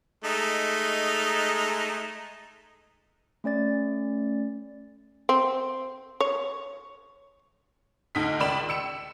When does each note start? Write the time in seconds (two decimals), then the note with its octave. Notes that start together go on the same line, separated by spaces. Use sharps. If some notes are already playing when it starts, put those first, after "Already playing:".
0.24 G#3 A3 D#4
3.44 A3 C#4 D5 A6
5.29 C4
6.20 C#5
8.15 D2 D#4 D#5 B6
8.39 C#2 D#3 D5 B5 E7
8.69 E6 C#7 E7